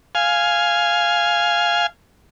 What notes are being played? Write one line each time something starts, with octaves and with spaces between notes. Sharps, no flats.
F5 G#5